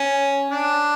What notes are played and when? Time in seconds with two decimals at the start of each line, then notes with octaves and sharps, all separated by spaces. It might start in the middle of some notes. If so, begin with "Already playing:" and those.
Already playing: C#4
0.51 D4